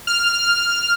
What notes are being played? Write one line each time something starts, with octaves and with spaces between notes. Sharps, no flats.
F6